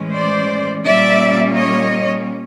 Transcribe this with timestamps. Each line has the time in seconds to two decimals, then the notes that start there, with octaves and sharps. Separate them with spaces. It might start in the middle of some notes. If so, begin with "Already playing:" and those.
Already playing: A2 E3 G#3 C#4
0.13 C5 D5
0.84 A#2 G3 A#3 C#4 D5 E5
1.55 C#5 D#5